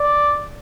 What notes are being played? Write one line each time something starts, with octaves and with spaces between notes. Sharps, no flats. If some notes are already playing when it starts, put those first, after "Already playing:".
Already playing: D5